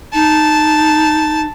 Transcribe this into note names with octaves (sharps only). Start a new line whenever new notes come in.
D#4 A5